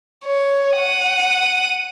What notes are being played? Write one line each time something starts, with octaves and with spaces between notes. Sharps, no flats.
C#5
F#5 D#7